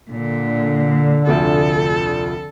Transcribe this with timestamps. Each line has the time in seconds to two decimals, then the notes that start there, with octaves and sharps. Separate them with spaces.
0.11 A#2 D3
1.27 F1 D2 F3 A4